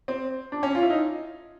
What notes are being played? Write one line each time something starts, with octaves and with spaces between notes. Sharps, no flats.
C4
D4
C#4
F4
E4
D#4